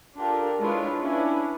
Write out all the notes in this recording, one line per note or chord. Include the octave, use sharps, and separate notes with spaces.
D4 F4 G4 A4 A#4
G#3 D4 E4 F4 B4 C#5
C#4 D4 E4 B4 C#5